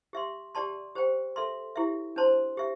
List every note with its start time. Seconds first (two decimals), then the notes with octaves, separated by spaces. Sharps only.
0.13 G4 E5 C6
0.55 G4 D5 A5 C6
0.95 G4 C5 G5
1.36 A4 E5 C6
1.76 E4 G4 E5
2.16 D4 C5 A5 C6
2.57 G4 E5